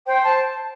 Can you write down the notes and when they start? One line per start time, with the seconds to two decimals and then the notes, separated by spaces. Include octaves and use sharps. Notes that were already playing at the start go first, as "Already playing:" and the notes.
0.06 C5 G5
0.24 A5